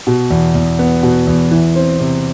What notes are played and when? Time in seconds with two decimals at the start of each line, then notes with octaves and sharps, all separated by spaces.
0.07 B2
0.31 E2
0.55 E2
0.79 B3
1.03 B2
1.27 E2
1.51 E3
1.76 C4
2.00 C3